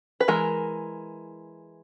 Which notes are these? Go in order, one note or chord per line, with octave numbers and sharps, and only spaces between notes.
B4
E3 G#3 A#4